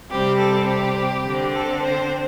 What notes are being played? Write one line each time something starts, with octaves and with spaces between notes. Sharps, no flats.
C3 G3 C4 G4
A4
G4
D3 C4
A4
C5